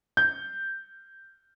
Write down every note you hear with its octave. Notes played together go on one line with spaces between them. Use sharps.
G6